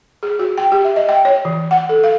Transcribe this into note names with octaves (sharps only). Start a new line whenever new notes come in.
G#4
F#4
G5
G4
E5
D#5
G5
C#5
E3
F#5
A4
F5